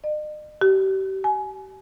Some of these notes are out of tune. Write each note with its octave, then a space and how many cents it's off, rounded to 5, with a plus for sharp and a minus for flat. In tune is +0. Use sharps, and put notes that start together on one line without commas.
D#5 -45
G4 -35
G#5 +25